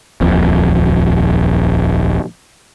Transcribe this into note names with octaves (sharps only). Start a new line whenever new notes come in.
D#1 A#1 F2